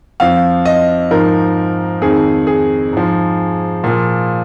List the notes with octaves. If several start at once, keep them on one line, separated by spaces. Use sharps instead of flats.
F2 F3 F5
D#5
G#2 F3 A#4
F2 D#3 G#4
G#4
G#2 F3
A#2 F3